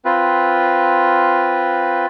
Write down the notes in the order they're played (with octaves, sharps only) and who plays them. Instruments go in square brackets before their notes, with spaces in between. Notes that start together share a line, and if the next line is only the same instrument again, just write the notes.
[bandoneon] C4 F4 B4